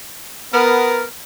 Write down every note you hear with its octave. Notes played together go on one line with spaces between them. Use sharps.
B3 A#4